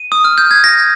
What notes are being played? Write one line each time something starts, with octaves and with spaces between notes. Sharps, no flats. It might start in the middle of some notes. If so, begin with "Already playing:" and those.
Already playing: D#7
D#6
F6
G6
G#6
A#6